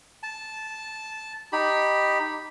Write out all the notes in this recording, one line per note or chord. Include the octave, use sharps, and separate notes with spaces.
A5
D#4 G4 B5